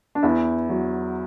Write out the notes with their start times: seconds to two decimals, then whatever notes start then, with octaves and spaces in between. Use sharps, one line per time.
0.15 D4
0.23 E2 E4
0.70 F#3